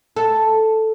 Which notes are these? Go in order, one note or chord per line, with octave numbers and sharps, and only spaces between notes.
A4